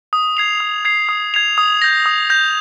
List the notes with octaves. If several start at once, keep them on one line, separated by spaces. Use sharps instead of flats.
D#6
G#6 C7 F7
D#6
G#6 C7 F7
D#6
G#6 C7 F7
D#6
G6 A#6
D#6
G6 A#6